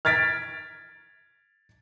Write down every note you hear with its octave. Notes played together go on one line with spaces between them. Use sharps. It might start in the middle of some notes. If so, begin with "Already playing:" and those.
F6 G#6 A6 B6 D7